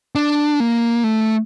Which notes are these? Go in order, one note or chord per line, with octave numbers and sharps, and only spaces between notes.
D4
A#3
A3